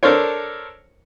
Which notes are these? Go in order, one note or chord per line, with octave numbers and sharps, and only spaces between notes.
D4 A4 A#4 C5 C#5